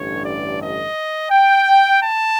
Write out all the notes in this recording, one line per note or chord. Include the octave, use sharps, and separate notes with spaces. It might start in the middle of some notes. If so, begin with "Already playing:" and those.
Already playing: A1 G2 D3 C#5
D5
D#5
G5
A5